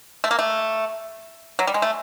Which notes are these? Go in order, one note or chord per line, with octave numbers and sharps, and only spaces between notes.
A3
A#3
A3
F#3
G3
G#3
A3